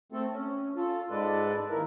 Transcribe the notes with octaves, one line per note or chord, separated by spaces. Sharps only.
A3 C4 A4
C#4
F4 A4
G#2 G#3 A4 B4 D5
D#2 E4 A#4